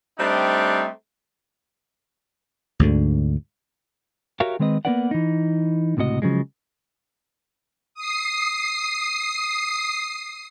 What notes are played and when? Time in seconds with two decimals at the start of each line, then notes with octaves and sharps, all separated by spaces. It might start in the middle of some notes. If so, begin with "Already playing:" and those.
0.19 G3 A3 C4 D4 D#4
2.80 D2 G#2 D3
4.40 F#4 G4 A#4 C#5 E5 F5
4.59 D#3 G#3 C4 B4 D#5
4.85 A#3 B3 D4 B4 D5 F#5
5.11 E3 D#4
5.97 C#2 A2 C3 F#4 D#5
6.22 C#3 F3 F#3 G#3
7.94 D#6 C7